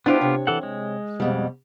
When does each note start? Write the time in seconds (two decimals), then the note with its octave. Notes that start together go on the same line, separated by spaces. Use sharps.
0.06 B3 D4 E4 F4 G4 C5
0.21 C3 C#5
0.47 E3 A4 F#5
0.63 G#3
1.20 F2 B2 G3